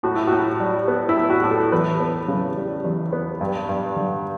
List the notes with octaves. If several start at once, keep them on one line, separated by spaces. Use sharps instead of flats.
A2 F#4
E4
A2 F#4
G3
B3
E4
A2
F#4
A2
A4
E2 B4
B3
C#3
G3
E2
B3
G2
G2
D3